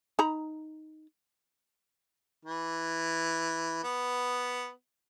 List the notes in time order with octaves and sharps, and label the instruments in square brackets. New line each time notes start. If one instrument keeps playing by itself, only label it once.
[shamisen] D#4 A#5 B5
[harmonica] E3
B3